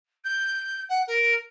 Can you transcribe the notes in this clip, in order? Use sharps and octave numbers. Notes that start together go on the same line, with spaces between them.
G6
F#5
A#4